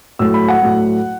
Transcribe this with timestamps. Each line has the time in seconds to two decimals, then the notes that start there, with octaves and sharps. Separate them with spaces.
0.19 A2 F#3 A3 E6
0.34 B5
0.48 F#5
0.62 A2 F#3 A3